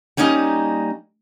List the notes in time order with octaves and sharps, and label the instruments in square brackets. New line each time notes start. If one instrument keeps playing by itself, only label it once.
[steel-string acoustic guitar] G3 A#3 C#4 D#4 D#5